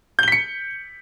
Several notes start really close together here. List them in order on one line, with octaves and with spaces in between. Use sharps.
G6 G7 B6 C#7